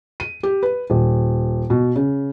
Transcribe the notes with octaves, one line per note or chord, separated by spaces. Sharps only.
D#7
G4
B4
D#1
B2
C#3